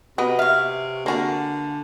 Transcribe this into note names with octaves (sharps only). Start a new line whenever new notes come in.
C3 B3 F#4 B4 D#5
C#5 E5 F5
D3 A#3 F#4 G#4 A#4 D5